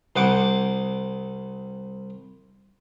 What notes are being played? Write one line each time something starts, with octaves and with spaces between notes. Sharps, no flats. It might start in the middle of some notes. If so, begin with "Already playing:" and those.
C2 C5 F#5 D6